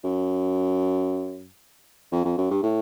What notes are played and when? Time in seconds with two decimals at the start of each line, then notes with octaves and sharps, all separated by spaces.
0.04 F#2
2.12 F2
2.25 F2
2.38 F#2
2.51 G2
2.63 A2